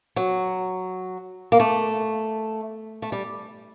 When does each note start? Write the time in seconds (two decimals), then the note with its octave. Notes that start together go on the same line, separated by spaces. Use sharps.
0.16 F#3
1.52 A#3
1.60 A3
3.02 A3
3.12 G3